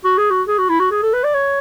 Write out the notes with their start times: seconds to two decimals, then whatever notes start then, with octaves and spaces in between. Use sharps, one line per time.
0.04 F#4
0.18 G#4
0.30 F#4
0.48 G#4
0.58 F#4
0.69 E4
0.79 F#4
0.91 G#4
1.02 A4
1.13 B4
1.24 D5
1.34 C#5